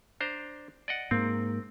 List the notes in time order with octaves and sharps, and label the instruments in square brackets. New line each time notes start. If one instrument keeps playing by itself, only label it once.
[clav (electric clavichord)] D4 C5 A#5
D5 D#5 F#5
[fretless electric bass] G#2 A#3 [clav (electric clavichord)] C4